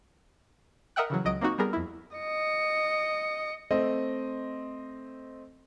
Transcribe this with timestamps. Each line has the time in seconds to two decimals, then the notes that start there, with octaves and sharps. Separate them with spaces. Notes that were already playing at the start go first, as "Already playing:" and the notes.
0.96 A#4 D#5 E5 F#5 G5 F#6
1.10 C#3 E3 F#3
1.25 C#2 F#3 D#5 D#6 D7
1.41 A#3 C4 D#4 F#4
1.58 G3 B3 G#4 A#4
1.73 F2 E4
2.16 D#5 C#7
3.71 A3 C4 D#5